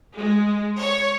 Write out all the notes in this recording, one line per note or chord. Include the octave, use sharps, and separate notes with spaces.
G#3
C#5